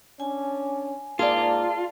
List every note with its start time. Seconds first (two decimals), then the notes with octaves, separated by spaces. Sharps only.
0.20 C#4 D4 G#5
1.19 G#2 A#3 F4 G#4 D5 A5